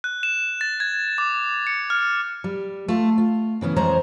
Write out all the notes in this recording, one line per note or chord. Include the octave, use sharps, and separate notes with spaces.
F#6
E7
A6
G#6
D6
C#7
F6
G3
A3 F4
F4
C#3 E3 B3 C#4
F2 E3 G#3 C5 C#5 A#5